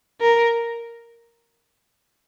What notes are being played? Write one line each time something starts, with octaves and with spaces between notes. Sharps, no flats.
A#4